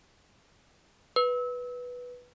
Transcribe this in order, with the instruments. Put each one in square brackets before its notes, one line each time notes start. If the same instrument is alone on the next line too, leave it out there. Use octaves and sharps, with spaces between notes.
[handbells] B4